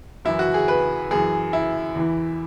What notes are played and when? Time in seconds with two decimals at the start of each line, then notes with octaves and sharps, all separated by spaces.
0.25 F#2 E3 E4
0.39 F#4
0.54 G#4
0.68 B4
1.11 F#2 E3 G#4
1.53 E4
1.96 E2 E3